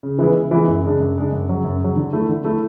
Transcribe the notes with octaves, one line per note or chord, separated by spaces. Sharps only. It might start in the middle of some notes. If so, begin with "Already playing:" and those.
C#3
E3 G#3 B3 E4
C#3
E3 G#3 B3 E4
F#2
C#3 G#3 D4
F#2
C#3 G#3 D4
F#2
C#3 F#3
F#2
C#3 F#3
D3
A3 E4
D3
A3 E4